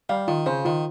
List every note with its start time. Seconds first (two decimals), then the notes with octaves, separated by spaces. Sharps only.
0.09 G3 F5
0.28 D#3 F4
0.46 C#3 C5
0.65 D#3 F4